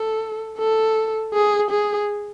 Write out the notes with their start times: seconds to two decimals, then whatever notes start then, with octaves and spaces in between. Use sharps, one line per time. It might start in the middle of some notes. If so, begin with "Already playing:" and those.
Already playing: A4
0.58 A4
1.33 G#4
1.71 G#4